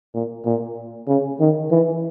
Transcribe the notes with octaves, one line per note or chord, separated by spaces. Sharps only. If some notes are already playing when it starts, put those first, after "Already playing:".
A#2
A#2
C#3
D#3
E3